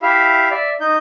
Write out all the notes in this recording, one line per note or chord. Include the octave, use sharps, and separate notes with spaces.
E4 G4 E5 F5
D5 E5
D#4 G6